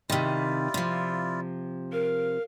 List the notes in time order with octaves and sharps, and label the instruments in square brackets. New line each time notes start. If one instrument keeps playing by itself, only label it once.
[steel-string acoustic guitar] C3 D#3 [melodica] E4 F4 D5
[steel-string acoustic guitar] C3 F3
[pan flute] A#4 [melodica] F5